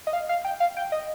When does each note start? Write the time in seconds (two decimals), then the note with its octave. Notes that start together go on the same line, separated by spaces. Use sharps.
0.07 D#5
0.13 F5
0.29 F5
0.45 G5
0.60 F5
0.77 G5
0.92 D#5